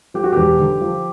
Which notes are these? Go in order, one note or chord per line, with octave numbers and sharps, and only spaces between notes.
F3 G4
F#4
E1 G4
D3
F3